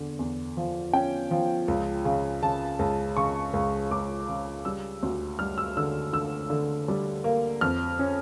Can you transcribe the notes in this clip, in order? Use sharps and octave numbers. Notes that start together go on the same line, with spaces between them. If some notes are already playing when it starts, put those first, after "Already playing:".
Already playing: E2 D3
E2
F3
C#4 G5
F3
C#2
C#3
C#3 A5
C#2
C#3 C#6
C#2
C#2 D6
C#3
G3 E6
D2
G3 F6
E6
D3 E6
D3 E6
D3
G3
A#3
F2 F6
C#4